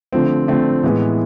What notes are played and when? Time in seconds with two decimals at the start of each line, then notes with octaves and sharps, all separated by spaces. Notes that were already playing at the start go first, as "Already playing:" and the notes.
0.13 D3 F3 A3 C4
0.48 D3 F3 A3 C4
0.83 A2 E3 G#3 B3